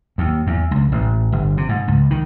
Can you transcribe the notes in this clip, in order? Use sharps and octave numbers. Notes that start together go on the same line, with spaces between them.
D#2
E2
C#2
A1
G1
C3
G#2
C#2
D#3